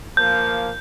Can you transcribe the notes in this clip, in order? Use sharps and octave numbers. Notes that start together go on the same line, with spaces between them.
F3 A#3 G6